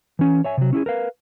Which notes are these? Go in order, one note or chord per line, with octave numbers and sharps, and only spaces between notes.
E3 C#4
C#5 E5 G#5
C3 F#3
C#4 E4 G4 G#4
A#4 B4 F5